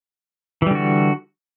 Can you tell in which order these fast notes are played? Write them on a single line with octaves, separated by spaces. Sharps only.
E3 G3 D3 F#4